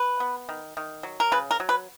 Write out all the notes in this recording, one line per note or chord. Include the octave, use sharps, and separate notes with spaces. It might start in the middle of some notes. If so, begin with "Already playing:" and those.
Already playing: B4
B3
D#3
D#3
F#3
A#4
C#3 B4
A#4
F#3
B4